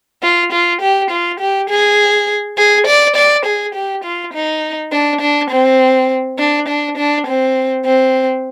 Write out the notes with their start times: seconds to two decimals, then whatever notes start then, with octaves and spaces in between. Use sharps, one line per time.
0.23 F4
0.52 F4
0.81 G4
1.11 F4
1.40 G4
1.69 G#4
2.57 G#4
2.87 D5
3.16 D5
3.45 G#4
3.75 G4
4.04 F4
4.33 D#4
4.93 D4
5.21 D4
5.51 C4
6.39 D4
6.68 D4
6.97 D4
7.27 C4
7.85 C4